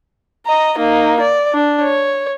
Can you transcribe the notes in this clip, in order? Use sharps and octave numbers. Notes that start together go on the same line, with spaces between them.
D#5 A#5
A#3 D#4
D5
D4
C#5